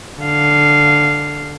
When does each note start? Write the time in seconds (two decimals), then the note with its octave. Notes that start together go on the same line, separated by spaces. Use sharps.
0.21 D3 F5